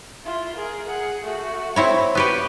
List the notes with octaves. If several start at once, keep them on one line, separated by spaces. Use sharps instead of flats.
E4 F4
G#4 A#4
G#4 F#5
A3 F#4
C4 E4 C#5
B3 G4 B4 C#6